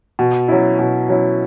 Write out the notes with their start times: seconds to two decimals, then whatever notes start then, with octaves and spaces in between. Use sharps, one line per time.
0.19 B2
0.48 F#3 C#4 E4
0.79 B2
1.09 F#3 C#4 E4